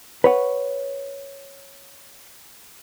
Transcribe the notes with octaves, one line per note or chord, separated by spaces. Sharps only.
B4 C#5 F#5